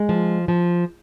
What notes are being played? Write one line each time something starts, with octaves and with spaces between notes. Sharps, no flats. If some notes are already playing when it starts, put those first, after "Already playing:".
Already playing: G#3
F3
F3